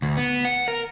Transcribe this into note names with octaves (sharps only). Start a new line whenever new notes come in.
D2
B3
F#5
A#4